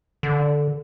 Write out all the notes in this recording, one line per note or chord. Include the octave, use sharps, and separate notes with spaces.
D3